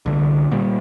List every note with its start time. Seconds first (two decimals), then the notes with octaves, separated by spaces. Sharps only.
0.06 C2 D3
0.51 A#2 G3